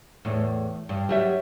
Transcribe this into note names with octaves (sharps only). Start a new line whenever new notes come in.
E2 A2
G2
F#3 G3 E5